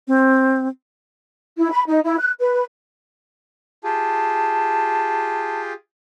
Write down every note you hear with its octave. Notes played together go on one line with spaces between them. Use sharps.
C4
E4
B5
D#4
E4
F#6
B4
F4 G4 G#4 A5